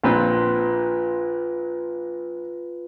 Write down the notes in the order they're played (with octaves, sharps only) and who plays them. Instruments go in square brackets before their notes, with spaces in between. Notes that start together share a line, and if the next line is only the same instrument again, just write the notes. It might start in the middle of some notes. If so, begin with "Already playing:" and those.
[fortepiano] A#1 A#2 C4 [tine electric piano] F4 B4